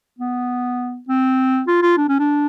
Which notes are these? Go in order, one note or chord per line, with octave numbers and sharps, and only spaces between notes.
B3
C4
F4
F4
D4
C#4
D4